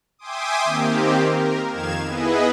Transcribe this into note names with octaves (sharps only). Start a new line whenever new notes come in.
E5 G5 G#5 C6 D6 D#6
D#3 A#3 C4 G4
A#4
F2 D#3 F5 G#6 E7
B3 E4 G#4 B4 D#5